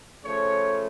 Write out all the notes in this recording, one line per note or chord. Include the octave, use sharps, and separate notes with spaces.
C#3 F3 A3 C#5